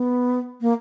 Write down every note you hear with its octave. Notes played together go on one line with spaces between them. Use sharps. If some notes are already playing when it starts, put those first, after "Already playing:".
Already playing: B3
A#3